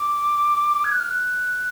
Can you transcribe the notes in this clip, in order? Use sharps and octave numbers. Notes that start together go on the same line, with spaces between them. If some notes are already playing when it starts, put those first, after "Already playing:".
Already playing: D6
G#6
F#6
F6
F#6